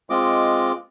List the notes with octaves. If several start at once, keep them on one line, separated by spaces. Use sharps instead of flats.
G#3 C4 F4 D#5 D6